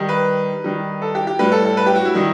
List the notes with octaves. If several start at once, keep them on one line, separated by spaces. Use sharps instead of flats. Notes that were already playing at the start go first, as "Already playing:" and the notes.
Already playing: D#3 G3
B4
D#3 G3
A4
G4
G4
A2 G3 B4
A4
A4
B4
G4
F#4
E4
D#3 G3